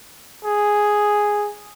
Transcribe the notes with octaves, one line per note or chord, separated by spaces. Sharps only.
G#4